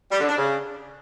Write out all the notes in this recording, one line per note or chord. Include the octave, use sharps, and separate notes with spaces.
G3
D3
D4
C#3